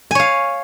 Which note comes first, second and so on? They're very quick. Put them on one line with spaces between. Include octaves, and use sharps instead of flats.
G#5 C#5 F5